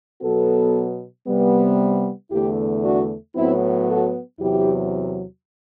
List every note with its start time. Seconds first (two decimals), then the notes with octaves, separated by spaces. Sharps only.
0.22 B2 F#3 B3 F#4 A4
1.26 C3 G3 B3
2.31 E2 D3 A3 E4 G4
2.83 D4 F#4
3.35 A2 F#3 B3 C4 E4
3.87 F#4 A4
4.40 E2 C3 F#3 E4 G4